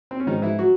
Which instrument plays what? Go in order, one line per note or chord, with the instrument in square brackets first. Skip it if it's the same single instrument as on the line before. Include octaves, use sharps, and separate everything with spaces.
[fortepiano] C4
C#4
[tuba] G#2 [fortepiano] D#3 D#4
[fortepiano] E3 E4
F#3 F#4